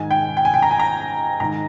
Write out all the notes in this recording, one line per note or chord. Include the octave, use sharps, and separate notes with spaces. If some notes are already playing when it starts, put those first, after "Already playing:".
Already playing: G#2 D#3 G#5
G5
G5
G#5
G5
A#5
G#5
A#5
G#2 D#3 A#5